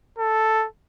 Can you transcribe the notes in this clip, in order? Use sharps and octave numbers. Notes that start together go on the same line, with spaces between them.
A4